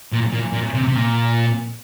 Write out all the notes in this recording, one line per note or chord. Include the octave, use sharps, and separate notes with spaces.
A#2
A#2
A#2
C3
C3
A#2